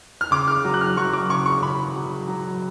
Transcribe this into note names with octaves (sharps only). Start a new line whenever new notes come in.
F6
C#3 D6
F6
F#3
F#6
F6
F#3 C#6
D6
C#3 C#6
C#6
C#3 B5
F#3
F#3